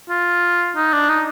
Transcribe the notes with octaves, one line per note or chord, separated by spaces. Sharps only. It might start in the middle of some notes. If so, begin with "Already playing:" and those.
F4
D#4
D4
D#4